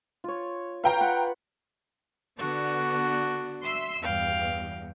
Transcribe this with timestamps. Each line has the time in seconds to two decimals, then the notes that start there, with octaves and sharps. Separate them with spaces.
0.24 F4 C#5
0.84 B4 F5 G5 A#5
1.00 F4 F#5 B5
2.38 D3 B3 D4 F#4
3.63 E5 C6 E6
4.02 E2 G2 F5 G5